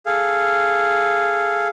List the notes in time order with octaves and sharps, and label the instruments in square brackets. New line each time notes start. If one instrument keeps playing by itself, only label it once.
[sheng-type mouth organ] G#4 A4 F5